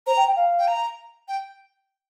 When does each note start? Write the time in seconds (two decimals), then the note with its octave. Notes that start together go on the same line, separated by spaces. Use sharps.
0.07 C5 A#5
0.17 G5
0.27 G5
0.36 F5
0.59 G5
0.68 A#5
1.28 G5